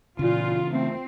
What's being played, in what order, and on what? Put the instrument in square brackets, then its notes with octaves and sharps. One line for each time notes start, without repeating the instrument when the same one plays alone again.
[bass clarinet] A#2 [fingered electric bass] C#3 E3 [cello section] F4
[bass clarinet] A3 [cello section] C4